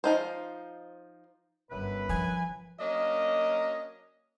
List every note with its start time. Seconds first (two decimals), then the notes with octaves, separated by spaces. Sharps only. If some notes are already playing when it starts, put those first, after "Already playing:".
0.04 F3 D#4 C5
1.71 G1 F#2 E4 B4
2.09 F3 G#5
2.80 F#3 A#3 C#4 D4 D#5